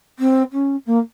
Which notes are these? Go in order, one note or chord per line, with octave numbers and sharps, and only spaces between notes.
C4
C#4
A#3